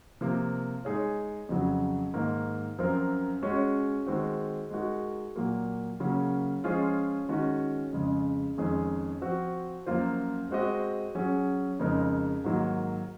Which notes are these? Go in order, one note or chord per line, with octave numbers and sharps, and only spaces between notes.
C3 F3 A#3
G#3 D#4 G#4 C#5
F2 C#3 F#3
G#2 D#3 A#3
F#2 F3 C4 F4 A#4
G#3 C#4 F#4 C#5
D#3 G#3 C4 F#4
G#3 D#4 F#4 A#4
A#2 F#3 A#3
C#3 F#3 A#3 C#4
F3 G#3 C#4 F4 G#4
D#3 G#3 C#4 F#4
F2 C#3 G#3
F2 D#3 G#3 C#4 G#4
F3 C4 F#4
F#2 F3 A#3 F4 C5
G#3 C4 F#4 C5 D#5
F#3 C#4 G#4
F2 C#3 G#3 D#4 A#4
G#2 D#3 F#3 A#3